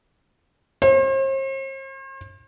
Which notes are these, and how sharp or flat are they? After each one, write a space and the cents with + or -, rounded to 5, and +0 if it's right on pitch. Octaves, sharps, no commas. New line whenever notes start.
C5 +45